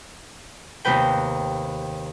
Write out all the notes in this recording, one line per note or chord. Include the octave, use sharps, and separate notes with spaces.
D#2 C3 B3 B4 G5